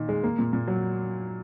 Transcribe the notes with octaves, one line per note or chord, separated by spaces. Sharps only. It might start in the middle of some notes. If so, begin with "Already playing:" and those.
Already playing: A#2 D#3
G#3
A#3
A#2
A#2
F#3